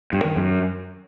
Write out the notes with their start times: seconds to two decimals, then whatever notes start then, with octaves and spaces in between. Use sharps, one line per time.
0.13 G2
0.24 D#3
0.36 F#2